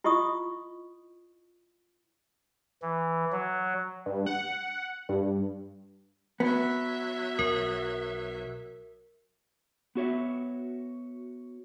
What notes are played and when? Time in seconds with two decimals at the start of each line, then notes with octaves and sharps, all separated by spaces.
0.04 E4 F4 D#5 C#6 D#6
2.82 E3
3.32 F#3
4.06 G2
4.26 F#5
5.09 G2
6.40 F#3 B3 E5
7.39 B1 A#4
9.95 B3 F#4 C#5 E5